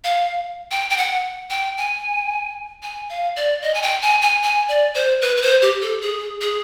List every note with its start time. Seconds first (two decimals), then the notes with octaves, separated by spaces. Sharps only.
0.04 F5
0.71 G5
0.90 G5
0.97 F#5
1.50 G5
1.77 G#5
2.83 G#5
3.09 F5
3.36 D5
3.62 D#5
3.74 G#5
3.82 G5
4.02 G#5
4.22 G#5
4.43 G#5
4.68 D5
4.95 C5
5.22 B4
5.37 B4
5.42 C5
5.62 G4
5.82 A4
6.01 G#4
6.41 G#4